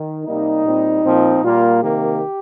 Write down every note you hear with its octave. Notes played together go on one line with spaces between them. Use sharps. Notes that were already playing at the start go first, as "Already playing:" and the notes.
Already playing: D#3
C3 G3 A#3 D#4
A#2 G3 C4
A#2 F3 C4
A#2 G3 A#3 F4
C3 D#3 A#3 G4